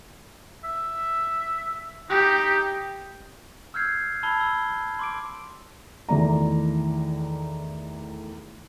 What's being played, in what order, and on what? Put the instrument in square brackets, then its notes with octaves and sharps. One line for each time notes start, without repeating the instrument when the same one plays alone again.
[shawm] E5
[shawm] D#4 [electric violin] G4
[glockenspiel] E6 F6 G6 G#6 C7
A5 B5 E6 G#6 G7
E6
C6 D6 D7
[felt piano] E2 D#3 A3 D5 A#5